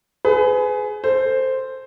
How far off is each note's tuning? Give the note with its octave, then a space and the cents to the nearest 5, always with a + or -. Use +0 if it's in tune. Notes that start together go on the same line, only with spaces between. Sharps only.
G#4 +20 B4 +30
A4 +25 C5 +0